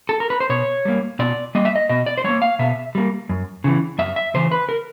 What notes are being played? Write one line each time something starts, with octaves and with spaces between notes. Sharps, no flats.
A4
A#4
B4
C5
B2 C#5
G3 A#3
B2 D5
G3 A#3 D#5
E5
D#5
B2 D#5
D5
C5
G3 A#3 C#5
F5
B2 E5
G3 A#3
F#2
C#3 E3
F#2 E5
E5
C#3 E3 C5
B4
A#4